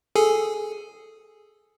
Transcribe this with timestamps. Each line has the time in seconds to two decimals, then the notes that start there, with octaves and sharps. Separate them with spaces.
0.15 G#4 A4 G#5